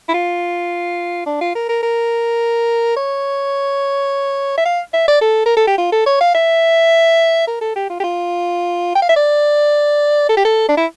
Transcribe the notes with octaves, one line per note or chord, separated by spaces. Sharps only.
E4
F4
D4
F4
A#4
A#4
A#4
C#5
E5
F5
E5
D5
A4
A#4
A4
G4
F4
A4
C#5
F5
E5
A#4
A4
G4
F4
G4
F4
G5
F5
E5
D5
A4
G4
A4
D4
E4